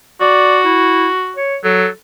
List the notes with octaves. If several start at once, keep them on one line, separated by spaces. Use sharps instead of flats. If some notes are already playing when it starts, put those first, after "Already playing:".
F#4 D5
E4
C#5
F#3 A4